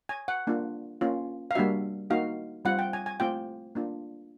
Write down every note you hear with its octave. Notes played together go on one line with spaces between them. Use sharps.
G#5
F#5
A#3 D4 F4
A#3 C#4 F4
F5
G3 A#3 D4 F#4 E5
A#3 D#4 F#4 F5
G3 C4 F4 F#5
G5
G#5
G#5
A3 C4 F4 G5
A#3 D4 F4